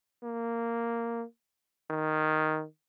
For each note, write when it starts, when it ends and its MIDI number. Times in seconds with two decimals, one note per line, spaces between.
0.23 1.24 58
1.90 2.64 51